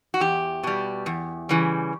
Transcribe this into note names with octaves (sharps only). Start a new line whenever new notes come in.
F#4
E2 G4
B2 G3
E2
C#3 E3 G3